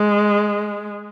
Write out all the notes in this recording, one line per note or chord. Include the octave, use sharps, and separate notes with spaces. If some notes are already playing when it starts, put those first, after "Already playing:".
Already playing: G#3